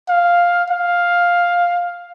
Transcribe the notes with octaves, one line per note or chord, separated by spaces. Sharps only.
F5
F5